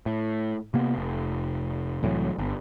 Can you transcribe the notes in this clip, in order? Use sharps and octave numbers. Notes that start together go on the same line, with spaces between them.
A2
C3 A#3 B3
F1
C2 A2 E3 F#3
G1